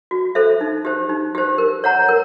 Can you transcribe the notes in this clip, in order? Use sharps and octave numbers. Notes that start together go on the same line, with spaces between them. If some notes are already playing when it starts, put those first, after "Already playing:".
F#4
A4 C5 E5
D#4
G4 C5
D#4
G4 C5
A#4
C#5 F#5 A#5
A#4